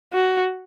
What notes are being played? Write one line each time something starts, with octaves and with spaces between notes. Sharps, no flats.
F#4